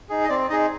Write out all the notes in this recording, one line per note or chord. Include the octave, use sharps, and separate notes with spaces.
D#4 G#4
D#5
C4 D5
D#4 G#4 D#5